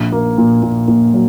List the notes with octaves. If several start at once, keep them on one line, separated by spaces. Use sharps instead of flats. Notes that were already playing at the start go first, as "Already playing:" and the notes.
Already playing: A#1
A#3
A#2
A#2
A#2
F#3